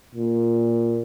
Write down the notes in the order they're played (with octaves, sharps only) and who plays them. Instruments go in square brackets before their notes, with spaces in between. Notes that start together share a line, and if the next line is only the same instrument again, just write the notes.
[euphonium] A#2